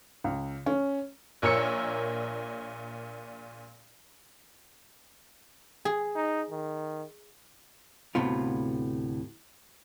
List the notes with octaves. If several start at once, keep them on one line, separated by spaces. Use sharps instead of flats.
C#2
C#4
A#1 A#2 A#4 C#5 E6 C#7
G#4
D#4
D#3
D2 A2 C3 B3 F4